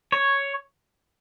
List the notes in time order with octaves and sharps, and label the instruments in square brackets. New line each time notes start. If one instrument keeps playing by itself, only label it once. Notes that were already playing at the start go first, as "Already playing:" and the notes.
[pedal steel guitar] C#5